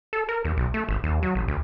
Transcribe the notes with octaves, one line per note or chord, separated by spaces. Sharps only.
A4
A#4
D#2
B1
A3
G#1
D#2
F#3
A1
D2